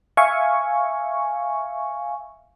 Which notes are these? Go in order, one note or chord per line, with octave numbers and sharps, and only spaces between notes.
E5 F5 G#5 C#6